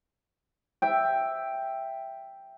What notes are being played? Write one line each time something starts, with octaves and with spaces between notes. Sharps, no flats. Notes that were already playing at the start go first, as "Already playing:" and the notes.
E5 G5